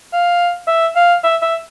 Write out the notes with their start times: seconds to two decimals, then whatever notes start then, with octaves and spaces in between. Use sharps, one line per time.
0.13 F5
0.68 E5
0.96 F5
1.24 E5
1.42 E5